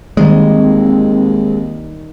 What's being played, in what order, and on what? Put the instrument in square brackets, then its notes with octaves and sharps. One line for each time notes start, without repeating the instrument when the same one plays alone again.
[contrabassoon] D#2 [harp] D#3 G3 D5 [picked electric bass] G#3 [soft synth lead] C4